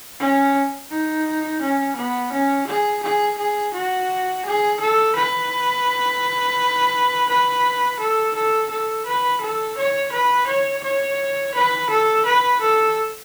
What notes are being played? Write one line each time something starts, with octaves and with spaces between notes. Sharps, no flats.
C#4
D#4
C#4
B3
C#4
G#4
G#4
G#4
F#4
G#4
A4
B4
B4
A4
A4
A4
B4
A4
C#5
B4
C#5
C#5
B4
A4
B4
A4